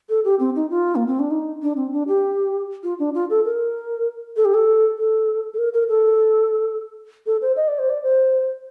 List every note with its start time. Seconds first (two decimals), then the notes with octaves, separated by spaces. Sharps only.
0.09 A4
0.24 G4
0.39 C4
0.55 D#4
0.70 F4
0.95 A#3
1.07 C4
1.19 D4
1.31 D#4
1.62 D4
1.76 C4
1.92 D4
2.08 G4
2.83 F4
2.99 D4
3.14 F4
3.30 A4
3.45 A#4
4.36 A4
4.45 G4
4.54 A4
4.98 A4
5.54 A4
5.58 A#4
5.73 A#4
5.89 A4
7.26 A4
7.41 C5
7.56 D#5
7.68 D5
7.79 C5
7.89 D5
8.03 C5